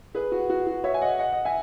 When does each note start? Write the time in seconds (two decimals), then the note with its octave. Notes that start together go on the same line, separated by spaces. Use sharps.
0.15 G#4 B4
0.32 F#4
0.50 F#4
0.67 F#4
0.84 C#5 E5
0.94 G#5
1.01 D#5 F#5
1.19 D#5 F#5
1.32 D#5 F#5
1.45 E5 G#5